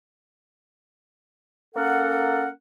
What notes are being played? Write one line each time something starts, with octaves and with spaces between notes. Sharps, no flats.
A#3 C#4 A4 A#4 F#5